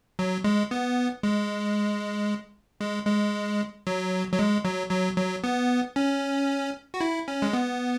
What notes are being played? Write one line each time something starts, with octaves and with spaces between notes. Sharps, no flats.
F#3
G#3
B3
G#3
G#3
G#3
F#3
F#3
G#3
F#3
F#3
F#3
B3
C#4
F#4
E4
C#4
G#3
B3